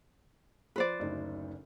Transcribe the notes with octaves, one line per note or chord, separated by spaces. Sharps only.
F3 B4 C5 D5
F#1 D2 D#4